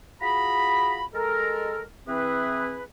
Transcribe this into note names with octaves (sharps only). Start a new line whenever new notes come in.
F4 F#4 G#4 A#5 B5
G#3 A4 A#4
E3 C4 G#4 B4